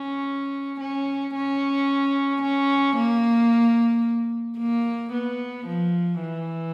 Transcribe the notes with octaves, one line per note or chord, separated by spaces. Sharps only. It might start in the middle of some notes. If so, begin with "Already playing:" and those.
Already playing: C#4
C#4
C#4
C#4
A#3
A#3
B3
F3
E3